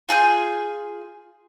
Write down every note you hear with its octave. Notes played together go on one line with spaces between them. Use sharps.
F4 G#4 G#5 G6